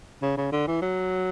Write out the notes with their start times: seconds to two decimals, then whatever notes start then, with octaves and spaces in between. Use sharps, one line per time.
0.22 C#3
0.37 C#3
0.52 D3
0.67 E3
0.81 F#3